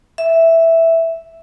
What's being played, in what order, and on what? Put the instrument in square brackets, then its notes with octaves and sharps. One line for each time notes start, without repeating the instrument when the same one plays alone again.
[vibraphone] E5